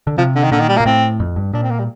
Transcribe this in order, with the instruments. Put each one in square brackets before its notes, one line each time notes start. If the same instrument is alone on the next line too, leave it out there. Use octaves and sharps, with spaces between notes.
[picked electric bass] D3
[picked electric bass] C3 [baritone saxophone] F3
[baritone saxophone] D3
D#3
[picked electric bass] A#2 [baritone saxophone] D3
[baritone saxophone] D#3
G3
A#3
[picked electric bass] A#2
[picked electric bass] A2 [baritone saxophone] C4
[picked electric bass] F2
G2
[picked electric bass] A#2 [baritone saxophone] D4
[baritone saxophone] C4
A#3
G3